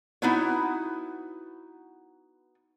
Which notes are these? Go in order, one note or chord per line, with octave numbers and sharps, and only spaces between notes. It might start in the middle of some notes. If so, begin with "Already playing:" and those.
B3 D#4 E4 F#4 B4 C#5